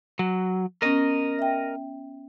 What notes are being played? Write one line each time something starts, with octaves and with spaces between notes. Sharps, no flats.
F#3
B3 C#4 A#4 D#5
E5 G5